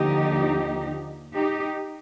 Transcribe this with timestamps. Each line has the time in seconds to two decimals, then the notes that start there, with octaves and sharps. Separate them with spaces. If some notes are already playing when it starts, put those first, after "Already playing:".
Already playing: D#2 D3 F3 D#4 G4
1.34 D#4 G4